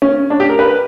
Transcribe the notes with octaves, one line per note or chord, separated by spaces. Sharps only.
C#4
D4
G4
A#4
B4